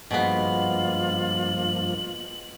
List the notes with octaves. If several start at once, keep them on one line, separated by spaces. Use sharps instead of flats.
G2 B2 F3 G#3 A#3 B3 F4 F#7